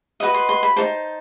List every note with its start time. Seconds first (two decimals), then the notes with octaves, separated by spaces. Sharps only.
0.20 F#4 B4 D#5
0.34 C6
0.49 C6
0.63 B5
0.76 D#4 F#4 C5 A5